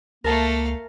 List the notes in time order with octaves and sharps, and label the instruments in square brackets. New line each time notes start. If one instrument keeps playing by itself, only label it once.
[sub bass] C#2 [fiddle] A3 F5 [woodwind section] A#3 [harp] A#4 A5